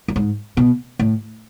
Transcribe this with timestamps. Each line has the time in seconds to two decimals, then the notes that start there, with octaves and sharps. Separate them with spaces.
0.08 F#2
0.16 G#2
0.57 B2
0.99 A2